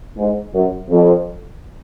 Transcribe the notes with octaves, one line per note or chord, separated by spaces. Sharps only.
G#2
F#2
F2